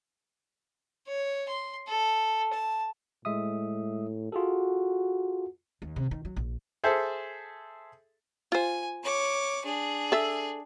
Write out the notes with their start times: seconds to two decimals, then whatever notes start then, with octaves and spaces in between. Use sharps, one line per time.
1.07 C#5
1.49 C6
1.88 A4
2.53 A5
3.25 A2 G#3 E5 D#6
4.32 F4 F#4 G#4 A4
5.82 D#2
5.96 C3
6.11 D#3
6.25 F#3
6.36 A#1
6.84 G#4 A4 C5 E5
8.52 F4 C5 G#5
9.03 C#5 D6
9.65 D4 G#4
10.12 A4 E5